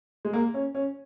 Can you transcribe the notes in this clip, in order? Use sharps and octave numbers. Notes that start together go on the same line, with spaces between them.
G#3
A#3
C#4
C#4